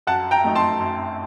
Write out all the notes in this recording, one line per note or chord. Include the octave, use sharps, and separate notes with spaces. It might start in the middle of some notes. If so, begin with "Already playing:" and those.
F#2 F#5 A5
G5 A#5
F#3 A3 D#4
A5 C6
F#2